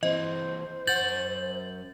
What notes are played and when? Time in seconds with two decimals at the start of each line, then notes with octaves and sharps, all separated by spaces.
0.03 E3 C4 C5 D#5
0.87 F#2 F#5 G6 A6 F#7